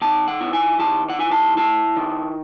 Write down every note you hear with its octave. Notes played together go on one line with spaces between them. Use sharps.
D#3 A5
F#5
E4
G#5
D#3 A5
F#5
E4 G#5
A5
E4 A5
D#3